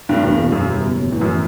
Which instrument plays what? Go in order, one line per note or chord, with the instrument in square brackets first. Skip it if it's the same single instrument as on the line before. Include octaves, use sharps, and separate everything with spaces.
[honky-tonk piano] G2 [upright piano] B2 A3
[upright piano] E1 [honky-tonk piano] G2
[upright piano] E2 B2
[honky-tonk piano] F#2 [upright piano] B2
[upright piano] G3 B3
F#1
F#2 F#3 B3
[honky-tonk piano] E2 [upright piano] A2
[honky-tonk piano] F#2
[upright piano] E3 A3